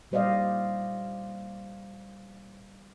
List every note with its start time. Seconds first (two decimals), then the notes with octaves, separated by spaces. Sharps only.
0.11 A#2 G3 C5 D5 D#5 F5